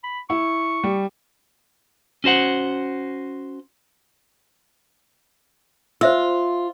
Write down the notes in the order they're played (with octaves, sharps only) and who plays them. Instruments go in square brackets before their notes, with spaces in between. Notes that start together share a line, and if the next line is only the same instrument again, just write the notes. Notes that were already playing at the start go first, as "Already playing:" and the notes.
[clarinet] B5
[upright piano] E4 [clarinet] C#6
[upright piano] G3
[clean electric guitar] C#4 F#4 C5 F#5
[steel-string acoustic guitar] F4 [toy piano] C5 E5 E6